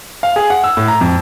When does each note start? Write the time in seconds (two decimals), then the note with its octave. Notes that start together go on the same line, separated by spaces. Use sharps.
0.23 F5
0.36 G#4
0.50 F#5
0.64 E6
0.77 A2
0.88 A#5
1.01 F2